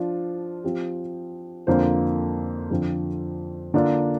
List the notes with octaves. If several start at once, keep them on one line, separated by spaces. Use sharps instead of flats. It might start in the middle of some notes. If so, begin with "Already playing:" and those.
Already playing: F3 D4 F4
F3 C4 G4
F2 D3 A#3 F4 C5
F2 D3 F3 C4 F4
D3 A#3 D4 F4